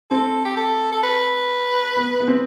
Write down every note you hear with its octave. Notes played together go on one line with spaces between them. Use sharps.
C4 A4
G4
A4
A4
B4
B3
B3
C4